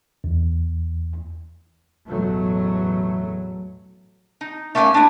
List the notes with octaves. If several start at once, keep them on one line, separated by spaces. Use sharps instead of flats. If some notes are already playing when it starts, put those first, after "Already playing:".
E2
A1 E2 B2 F#3 A3
D#4
A3 A#3 C#4 F#5 G#5
D4 E4